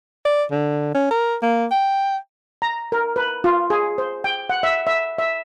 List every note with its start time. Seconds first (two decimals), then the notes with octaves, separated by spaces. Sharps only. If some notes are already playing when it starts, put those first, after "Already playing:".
0.25 D5
0.51 D3
0.95 C#4
1.11 A#4
1.42 A#3
1.71 G5
2.62 A#5
2.92 A#4
3.16 B4
3.44 F4
3.70 G#4
3.98 C5
4.24 G5
4.50 F#5
4.63 E5
4.87 E5
5.19 E5